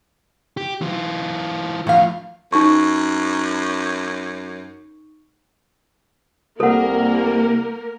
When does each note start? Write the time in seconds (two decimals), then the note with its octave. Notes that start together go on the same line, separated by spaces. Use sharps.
0.57 G4
0.81 E3 F4
1.87 E2 A2 F3 F5
2.53 F#2 D#4 C#6
6.60 C2 A#3 A4 A#4 F#5